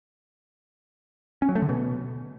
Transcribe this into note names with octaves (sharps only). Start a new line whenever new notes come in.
C#4
F#3
A3
D3
B2